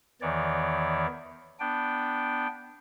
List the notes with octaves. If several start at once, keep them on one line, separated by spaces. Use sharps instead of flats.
E2 D#3 E3 C#5 D5
B3 D4 G5